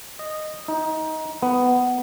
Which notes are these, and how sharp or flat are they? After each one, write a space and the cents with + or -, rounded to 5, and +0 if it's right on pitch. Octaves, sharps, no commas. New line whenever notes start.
D#5 -10
D#4 +20
B3 +10